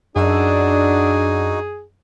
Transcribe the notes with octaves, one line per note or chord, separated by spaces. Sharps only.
F#2 D4 D#4 F#4 G#4 F#5 E6